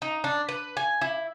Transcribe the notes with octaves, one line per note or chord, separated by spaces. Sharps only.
D#4
D4
B4
G#5
E4